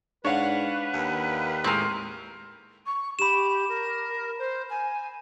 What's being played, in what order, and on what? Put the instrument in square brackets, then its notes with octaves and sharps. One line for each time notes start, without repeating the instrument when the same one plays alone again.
[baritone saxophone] G#2 [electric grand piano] D4 F5 F#5 [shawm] B4 [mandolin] C#5
[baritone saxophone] D#2
[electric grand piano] A2 G#3 D#7 [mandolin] C4 A#4
[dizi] C#6
[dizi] G4 [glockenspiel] B5 E7
[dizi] A#4
C5
G#5